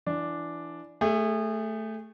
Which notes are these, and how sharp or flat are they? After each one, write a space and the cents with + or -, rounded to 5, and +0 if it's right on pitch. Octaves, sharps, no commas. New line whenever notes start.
E3 +25 D4 +0
A3 +0 G#4 -30